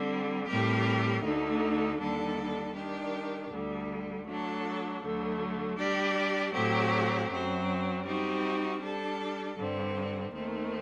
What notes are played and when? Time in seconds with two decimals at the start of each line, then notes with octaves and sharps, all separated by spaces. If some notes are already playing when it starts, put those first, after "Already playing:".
Already playing: D3 G3 C4
0.47 A2 G3 C4 G4 A#4
1.23 D2 D3 A3 D#4
1.98 D#2 D3 G3 D4 A4
2.75 D#3 G3 D4 G4
3.50 D2 D3 G3
4.26 F#3 A3 D4 A4
5.02 D2 D3 F#3 A3
5.78 G3 D4 G4 D5
6.53 A2 F#3 A3 C4 G4
7.29 F#2 F#3 C4
8.05 G3 C4 D#4 F#4
8.81 G3 D4 A4
9.56 G2 D3 G3 C4
10.32 D#2 D#3 A3 C4